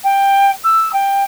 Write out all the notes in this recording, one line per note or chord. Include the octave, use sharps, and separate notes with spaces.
G5
E6
G5